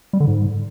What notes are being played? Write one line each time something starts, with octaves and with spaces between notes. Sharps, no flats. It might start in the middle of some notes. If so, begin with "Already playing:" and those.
G3
D3
G#2